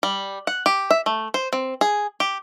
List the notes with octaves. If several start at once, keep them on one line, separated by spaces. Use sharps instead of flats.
G3
F#5
G4
E5
A3
C5
C4
G#4
G4